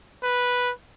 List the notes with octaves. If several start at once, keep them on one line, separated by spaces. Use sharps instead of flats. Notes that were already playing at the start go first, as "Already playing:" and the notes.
B4